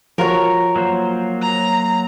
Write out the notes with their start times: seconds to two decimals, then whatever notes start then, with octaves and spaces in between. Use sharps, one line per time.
0.18 F3 F4 F#4 A#4 C#5
0.76 F#3 A#3 C5
1.42 A#5